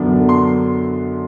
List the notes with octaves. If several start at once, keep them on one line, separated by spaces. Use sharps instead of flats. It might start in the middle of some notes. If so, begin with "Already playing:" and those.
Already playing: F#2 D3 F#3 B3 D4
C6